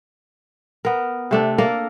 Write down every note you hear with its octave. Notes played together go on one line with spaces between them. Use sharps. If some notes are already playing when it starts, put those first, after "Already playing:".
B3 A#4
C3 A3 D4
A#3 A4 A#4 D5